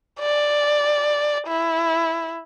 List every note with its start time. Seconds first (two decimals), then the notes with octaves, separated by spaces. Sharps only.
0.20 D5
1.47 E4